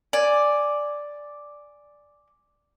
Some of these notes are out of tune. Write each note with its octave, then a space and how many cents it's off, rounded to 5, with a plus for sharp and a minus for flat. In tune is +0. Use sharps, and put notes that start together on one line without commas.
D5 +0 G#5 +0